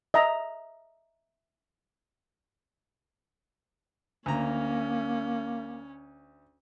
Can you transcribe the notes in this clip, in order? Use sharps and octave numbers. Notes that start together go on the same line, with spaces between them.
D#5 E5 A#5
D2 A#3 C#4 A#5